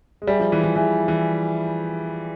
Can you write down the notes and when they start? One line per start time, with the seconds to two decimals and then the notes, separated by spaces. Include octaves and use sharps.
0.22 G#3
0.27 G3 G#4 E5 G#5
0.40 F3
0.52 E3
0.63 E3
0.76 E3 G#4 E5 G#5
1.08 E3